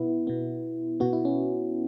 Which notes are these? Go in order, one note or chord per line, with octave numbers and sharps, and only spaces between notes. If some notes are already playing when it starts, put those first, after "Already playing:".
Already playing: B2 B3 E4
B2 B3
B2 B3 F#4
E4
C#4